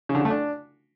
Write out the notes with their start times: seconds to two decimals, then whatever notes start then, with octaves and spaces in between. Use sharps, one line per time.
0.09 C#3
0.15 D3
0.20 C#3
0.25 A3
0.30 D4